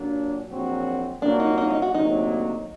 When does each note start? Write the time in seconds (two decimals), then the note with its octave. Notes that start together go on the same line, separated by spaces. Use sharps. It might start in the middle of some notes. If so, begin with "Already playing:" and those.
Already playing: A#2 F#3 A#3 D4
0.49 A#1 A#2 F#3 C4 F#4
1.21 C2 A#2 F#3 A#3 D4 F#4
1.40 D#4
1.58 D#4
1.70 D#4
1.82 F#4
1.94 D2 C3 F#3 A#3 D#4